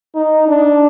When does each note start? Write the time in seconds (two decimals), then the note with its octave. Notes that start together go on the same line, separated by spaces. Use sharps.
0.15 D#4
0.48 D4